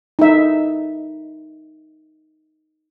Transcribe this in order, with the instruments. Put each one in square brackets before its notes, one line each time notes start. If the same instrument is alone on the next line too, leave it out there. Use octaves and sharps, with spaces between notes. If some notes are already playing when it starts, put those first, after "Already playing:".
[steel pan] D#4 E5